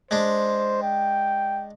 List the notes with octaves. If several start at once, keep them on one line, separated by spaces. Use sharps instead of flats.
G#3 D4 C5
G5